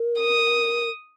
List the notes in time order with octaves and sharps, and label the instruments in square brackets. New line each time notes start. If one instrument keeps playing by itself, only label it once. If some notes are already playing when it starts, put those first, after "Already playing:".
Already playing: [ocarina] A#4
[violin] D#6